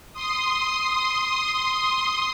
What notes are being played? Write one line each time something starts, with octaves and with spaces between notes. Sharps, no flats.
C6 D#6